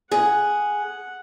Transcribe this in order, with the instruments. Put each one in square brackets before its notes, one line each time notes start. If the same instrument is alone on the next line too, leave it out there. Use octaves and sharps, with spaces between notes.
[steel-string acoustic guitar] G#4 [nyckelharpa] F#5